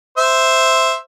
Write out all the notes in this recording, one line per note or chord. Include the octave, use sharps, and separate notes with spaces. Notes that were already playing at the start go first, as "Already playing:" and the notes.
C5 E5